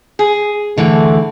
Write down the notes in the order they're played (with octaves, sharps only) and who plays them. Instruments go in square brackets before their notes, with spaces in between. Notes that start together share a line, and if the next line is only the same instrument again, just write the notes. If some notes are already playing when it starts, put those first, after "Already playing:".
[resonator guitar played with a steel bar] G#4
[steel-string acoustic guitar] D3 E3 [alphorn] A3